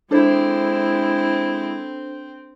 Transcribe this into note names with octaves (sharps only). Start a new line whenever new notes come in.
G#3 C4 D4 E4 A4 C5